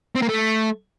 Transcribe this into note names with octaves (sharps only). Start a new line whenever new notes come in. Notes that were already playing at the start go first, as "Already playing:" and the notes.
C4
A#3
A3